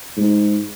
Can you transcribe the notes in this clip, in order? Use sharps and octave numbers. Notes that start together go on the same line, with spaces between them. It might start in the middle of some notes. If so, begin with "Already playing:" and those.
G#2